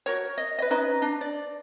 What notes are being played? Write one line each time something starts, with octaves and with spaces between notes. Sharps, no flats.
F#4 A#4 C#5
D#5
B4 D#5
C#4 D#4 B4 D#5
D4
D5